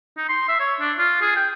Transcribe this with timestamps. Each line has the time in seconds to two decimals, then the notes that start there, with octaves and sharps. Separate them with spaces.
0.17 D#4
0.29 C6
0.48 E5
0.60 C#5
0.81 D4
0.98 F4
1.21 G#4
1.36 G5